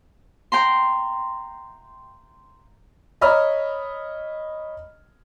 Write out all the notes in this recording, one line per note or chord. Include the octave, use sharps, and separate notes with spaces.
G5 A#5 C6
C#5 D#5 A#5 B5 E6 F6